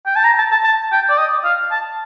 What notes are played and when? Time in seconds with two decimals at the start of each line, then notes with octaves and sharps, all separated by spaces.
0.06 G5
0.16 A5
0.24 A#5
0.39 A5
0.52 A5
0.64 A5
0.92 G5
1.10 D5
1.18 D#5
1.45 F5
1.71 A5